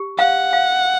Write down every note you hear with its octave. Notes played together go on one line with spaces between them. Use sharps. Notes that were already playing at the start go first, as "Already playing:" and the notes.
Already playing: G4
F5 F#5
F5